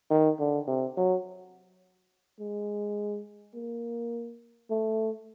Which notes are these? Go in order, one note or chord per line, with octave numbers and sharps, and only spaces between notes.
D#3
D3
C3
F#3
G#3
A#3
A3